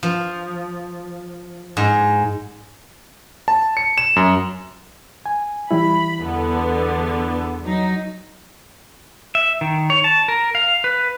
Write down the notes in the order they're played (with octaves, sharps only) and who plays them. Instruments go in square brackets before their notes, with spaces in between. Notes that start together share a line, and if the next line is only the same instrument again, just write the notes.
[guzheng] F3
G#2
[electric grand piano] A5
C#7
E7
F#2
[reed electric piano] G#5
[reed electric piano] E3 G3 E4 [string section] B5
[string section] E2 D3 B3
F#3 D#4
[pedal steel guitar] E5
D#3
C#5
A5
A#4
F5
B4